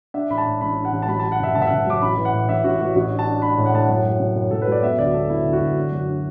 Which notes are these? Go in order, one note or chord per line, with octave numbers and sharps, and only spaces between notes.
D4 E5
A1 B5
A5
A2
A1 B5
D4
F#5
A1
A5
F#3 B5
F#3 A5
F#5
F#1 E5
F#1 A5
E5
F#1 F#5
F#3 D6
A1 B5
E3
F#5
A2
A1 E5
A1 F#4
A3 F#4
A1 F#4
D4
A5
D4
D4 B5
A2
F#5
A2 A5
F#5
F#2
F#3
F#2
F#2
F#2 A4
B4
F#3 D5
B3 E5
D2 D5
B3 A4
B3 E4
D2
F#4
D2
D4
F#2
D4